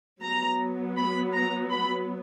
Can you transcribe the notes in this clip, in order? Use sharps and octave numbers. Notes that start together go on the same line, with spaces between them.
F#3 B3 A#5
B5
A#5
B5